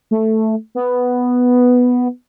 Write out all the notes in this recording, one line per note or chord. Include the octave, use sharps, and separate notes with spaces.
A3
B3